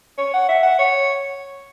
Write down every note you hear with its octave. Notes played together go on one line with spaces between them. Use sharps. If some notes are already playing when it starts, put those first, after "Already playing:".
C#5
F#5
E5
F#5
C#5